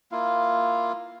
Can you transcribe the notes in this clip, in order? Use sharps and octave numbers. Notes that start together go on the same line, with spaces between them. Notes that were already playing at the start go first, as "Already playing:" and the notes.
A#3 E4 F4 F5